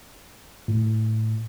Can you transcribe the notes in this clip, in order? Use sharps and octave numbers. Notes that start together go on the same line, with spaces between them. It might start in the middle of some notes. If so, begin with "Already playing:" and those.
A2